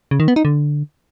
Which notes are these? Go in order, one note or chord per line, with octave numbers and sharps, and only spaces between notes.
C#3
D#3
B3
D#4
D3